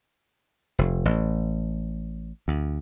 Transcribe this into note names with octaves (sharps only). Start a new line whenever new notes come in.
F1
A1
D2